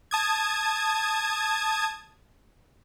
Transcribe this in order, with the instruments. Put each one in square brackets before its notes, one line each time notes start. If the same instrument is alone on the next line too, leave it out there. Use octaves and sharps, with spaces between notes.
[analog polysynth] A5 D#6 G#6